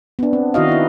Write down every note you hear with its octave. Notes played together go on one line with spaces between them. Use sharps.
B3 D4
C4
D#3 E4 F#4 D#5 F5
D#4 E4